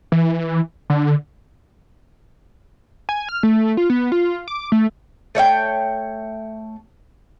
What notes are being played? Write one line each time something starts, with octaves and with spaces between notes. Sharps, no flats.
E3
D3
G#5
F6
A3
F4
B3
F4
D6
A3
A3 C#5 E5 G5